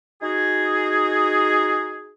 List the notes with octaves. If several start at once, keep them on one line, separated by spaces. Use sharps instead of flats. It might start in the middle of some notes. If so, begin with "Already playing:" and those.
D#4 F#4 G#4